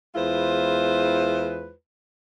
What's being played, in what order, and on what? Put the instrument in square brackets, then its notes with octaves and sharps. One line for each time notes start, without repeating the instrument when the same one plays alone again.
[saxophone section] E2 G#3 E4 F4 B4 C5